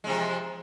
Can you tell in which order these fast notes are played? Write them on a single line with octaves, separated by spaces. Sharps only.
G#3 C3 F3